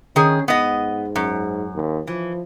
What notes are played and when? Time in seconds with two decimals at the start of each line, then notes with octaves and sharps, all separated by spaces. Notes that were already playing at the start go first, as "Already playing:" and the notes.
0.16 D#3 C#4 G#4
0.48 G#2 B3 D#5
1.16 F#2
1.74 D#2
2.07 E3 F3